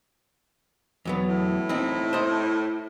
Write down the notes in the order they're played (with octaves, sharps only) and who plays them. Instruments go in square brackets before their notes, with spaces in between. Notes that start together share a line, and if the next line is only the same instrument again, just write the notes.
[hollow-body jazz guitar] E2 F#3 B3
[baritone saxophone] A2
[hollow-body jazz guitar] C4 D#4 E4
C5 D#5